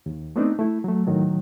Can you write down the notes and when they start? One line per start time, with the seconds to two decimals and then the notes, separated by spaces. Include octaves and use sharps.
0.06 D#2
0.36 A3 B3 C4 D4 D#4
0.59 A3 E4
0.84 F#3 A3
1.07 A2 D#3 F#3